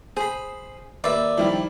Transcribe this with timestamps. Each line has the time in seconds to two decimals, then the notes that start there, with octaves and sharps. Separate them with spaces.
0.17 G#4 C5 B5
1.04 D#2 B4 D5 E5
1.38 D#3 F3 G3 E4